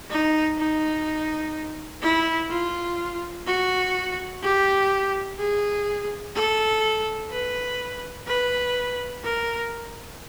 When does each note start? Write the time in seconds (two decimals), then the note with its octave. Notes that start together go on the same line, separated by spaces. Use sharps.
0.10 D#4
0.58 D#4
2.02 E4
2.50 F4
3.46 F#4
4.42 G4
5.39 G#4
6.35 A4
7.32 B4
8.27 B4
9.24 A#4